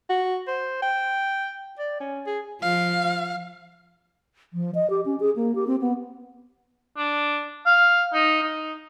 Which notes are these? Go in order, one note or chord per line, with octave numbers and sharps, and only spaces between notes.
F#4
C5
G5
D5
C#4
G#4
F3 F5
F3
D#5
G4
C#4
G#4
A#3
G4
C4
B3
D4
F5
D#4
D#4